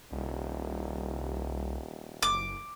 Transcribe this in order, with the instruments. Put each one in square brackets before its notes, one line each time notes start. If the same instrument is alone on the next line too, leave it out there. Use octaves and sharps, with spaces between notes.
[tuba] D#1 [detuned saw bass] C2
[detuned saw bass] F#1 [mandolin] D6